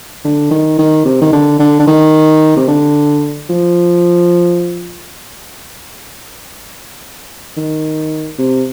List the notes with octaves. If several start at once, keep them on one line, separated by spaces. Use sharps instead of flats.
D3
D#3
D#3
C3
D#3
D3
D3
D3
D#3
C3
D3
F3
D#3
C3